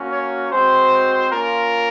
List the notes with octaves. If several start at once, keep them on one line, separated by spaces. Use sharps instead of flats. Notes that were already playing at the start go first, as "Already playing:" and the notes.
Already playing: A#3 C#4 F#4
C#5
G#3 C4 F#4 C5
A#3 C#4 F4 A#4